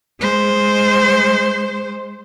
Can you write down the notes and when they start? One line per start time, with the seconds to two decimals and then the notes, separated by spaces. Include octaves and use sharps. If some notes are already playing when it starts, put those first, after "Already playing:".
0.20 G#3 C5